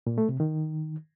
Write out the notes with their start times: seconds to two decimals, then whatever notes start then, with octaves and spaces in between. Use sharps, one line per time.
0.07 A#2
0.18 A3
0.29 C3
0.40 D#3